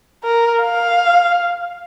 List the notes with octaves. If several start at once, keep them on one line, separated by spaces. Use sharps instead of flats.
A#4
F5